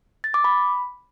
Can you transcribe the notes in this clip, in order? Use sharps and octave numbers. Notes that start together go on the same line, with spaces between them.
A6
D6
B5